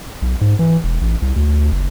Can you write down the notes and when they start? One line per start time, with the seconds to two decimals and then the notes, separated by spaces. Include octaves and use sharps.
0.22 B1
0.41 G#2
0.59 E3
0.84 E1
1.01 A1
1.22 C2
1.36 D2
1.72 F#1